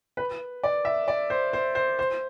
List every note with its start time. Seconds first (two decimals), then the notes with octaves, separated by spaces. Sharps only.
0.17 B4
0.63 D5
0.85 E5
1.08 D5
1.30 C5
1.53 C5
1.75 C5
1.99 C5